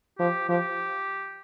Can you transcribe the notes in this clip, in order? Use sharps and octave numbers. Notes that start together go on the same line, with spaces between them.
F3 G4
F3 G4